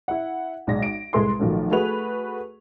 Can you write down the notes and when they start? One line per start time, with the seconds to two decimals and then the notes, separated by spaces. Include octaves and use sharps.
0.08 E4 F#5
0.67 B1 G#3 D5 A#6
0.83 D7
1.13 C2 G#3 A4 B4 C6
1.39 B1 D#3 F3 F#3 A3
1.71 A3 F#4 G#4 B4 F7